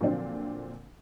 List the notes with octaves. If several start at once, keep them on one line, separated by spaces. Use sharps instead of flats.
A#2 D3 F3 F#3 C4 D4